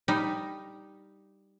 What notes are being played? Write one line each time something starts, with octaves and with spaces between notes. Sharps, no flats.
G3 D#4